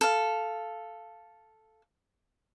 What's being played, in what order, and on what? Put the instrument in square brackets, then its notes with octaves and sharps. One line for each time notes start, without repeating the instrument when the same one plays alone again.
[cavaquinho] A4 F5